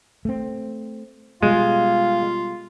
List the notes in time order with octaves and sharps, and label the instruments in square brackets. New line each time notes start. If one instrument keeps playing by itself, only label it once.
[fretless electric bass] A3 C4
[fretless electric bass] B2 G3 [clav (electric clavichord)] G#3 [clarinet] F4 [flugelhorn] F5